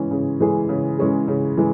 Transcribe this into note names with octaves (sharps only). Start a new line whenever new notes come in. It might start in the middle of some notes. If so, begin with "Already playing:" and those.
Already playing: C#3 E3 G#3 C#4 G#4
C#3
E3 G#3 C#4 G#4
C#3
E3 G#3 C#4 G#4
C#3
E3 G#3